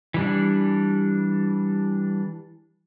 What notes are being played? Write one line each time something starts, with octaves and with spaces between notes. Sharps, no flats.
E3 G3 D4